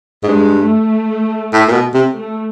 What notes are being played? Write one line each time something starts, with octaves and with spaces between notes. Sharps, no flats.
G#2
G2 G#3
A3
A2
A#2
B2
C3
A3